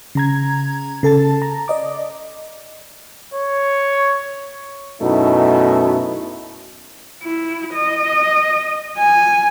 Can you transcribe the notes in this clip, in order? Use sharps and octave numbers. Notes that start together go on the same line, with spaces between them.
C#3 A#5 G#6
C#3 A4 A5 A6
A#5
D5 D#5 D6
C#5
F#2 B2 A3 D#4 E4
E4
D#5
G#5